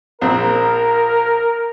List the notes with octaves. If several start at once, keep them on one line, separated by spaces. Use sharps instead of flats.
A#1 C4 A#4